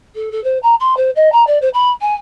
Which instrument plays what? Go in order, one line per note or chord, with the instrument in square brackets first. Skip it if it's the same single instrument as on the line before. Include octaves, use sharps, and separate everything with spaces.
[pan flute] A4
A4
C5
A#5
C6
C5
D#5
A#5
D5
C5
B5
G#5